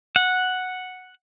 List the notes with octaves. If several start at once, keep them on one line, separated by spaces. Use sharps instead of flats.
F#5